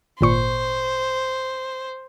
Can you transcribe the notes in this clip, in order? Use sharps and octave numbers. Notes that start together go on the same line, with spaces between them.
G#1 A#2 C5 C#6